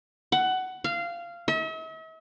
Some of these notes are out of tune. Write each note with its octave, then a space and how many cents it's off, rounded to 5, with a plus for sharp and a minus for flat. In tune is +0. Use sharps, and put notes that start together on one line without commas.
F#5 +15
F5 -15
E5 -45